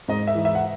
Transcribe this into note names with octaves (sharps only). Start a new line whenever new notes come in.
G#2 D#5
E5
E3
E5
F#5